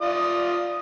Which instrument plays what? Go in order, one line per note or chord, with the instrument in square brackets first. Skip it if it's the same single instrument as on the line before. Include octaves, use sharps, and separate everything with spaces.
[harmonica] F4 D5 D#6